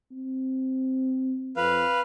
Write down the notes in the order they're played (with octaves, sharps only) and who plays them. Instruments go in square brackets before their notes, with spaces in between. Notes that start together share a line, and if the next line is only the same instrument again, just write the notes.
[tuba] C4
[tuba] F2 [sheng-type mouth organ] B4 F5